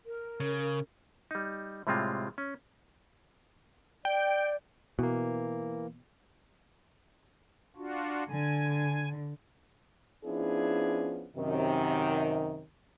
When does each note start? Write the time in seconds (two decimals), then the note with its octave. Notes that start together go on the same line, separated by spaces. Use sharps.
0.06 A#4
0.40 C#3
1.31 G3 D#4
1.87 A2 C3 G3 G#3 C4 F4
2.38 C#4
4.05 D5 G5
4.99 B2 E3 A#3
7.76 D4 F4 F#4
8.29 D3 G#5
10.25 F3 B3 C#4 D4 E4 G#4
11.36 F#2 C3 D#3